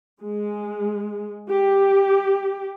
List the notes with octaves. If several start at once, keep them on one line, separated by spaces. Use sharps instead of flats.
G#3
G4